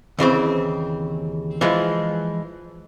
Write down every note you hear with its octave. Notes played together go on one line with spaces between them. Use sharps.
D#2 C#3 E3 C4
E3 F3 G#3